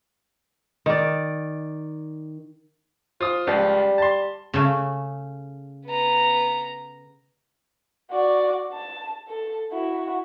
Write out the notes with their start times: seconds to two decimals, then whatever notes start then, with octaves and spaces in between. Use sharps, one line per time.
0.86 D#3 D5
3.21 F4 C5 D#6
3.47 C#2 F3 G3
3.98 A5 C6
4.53 C#3 A3
5.87 B3 A#5
8.11 F#4 D5
8.73 A5
9.28 A4
9.72 E4 F#4